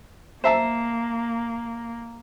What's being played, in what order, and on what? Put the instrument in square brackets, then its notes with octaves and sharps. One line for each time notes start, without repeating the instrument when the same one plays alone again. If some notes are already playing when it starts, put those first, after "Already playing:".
[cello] A#3 [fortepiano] C5 E5 A5 [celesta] A#5 C7 E7